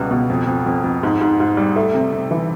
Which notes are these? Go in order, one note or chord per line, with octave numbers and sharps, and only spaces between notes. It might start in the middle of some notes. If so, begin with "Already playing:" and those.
Already playing: C#2 B2 G3 B3
B2
F2
F2
F2
F2
G#2
G#2
G#2
G3
A3
C3
C3
E3